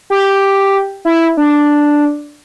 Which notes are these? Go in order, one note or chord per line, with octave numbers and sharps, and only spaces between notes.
G4
E4
D4